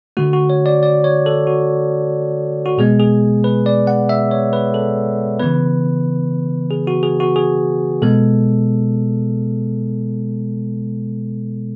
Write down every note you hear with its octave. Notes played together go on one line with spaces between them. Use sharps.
D3 A3 F#4
F#4
C#5
D5
D5
C#5
A4
F#4
F#4
B2 G#3 B3 G#4
G#4
B4
D5
F#5
E5
C#5
B4
A4
C#3 E3 B3 B4
G#4
F#4
G#4
F#4
G#4
B2 G#3 B3 A4